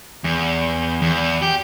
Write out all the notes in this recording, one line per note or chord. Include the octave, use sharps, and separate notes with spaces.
E2
E2
G4